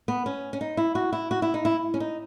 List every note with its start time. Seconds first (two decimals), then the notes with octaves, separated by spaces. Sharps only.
0.08 B3
0.26 C#4
0.53 C#4
0.61 D#4
0.77 E4
0.95 F#4
1.13 E4
1.31 F#4
1.42 E4
1.54 D#4
1.65 E4
1.94 C#4
2.00 D#4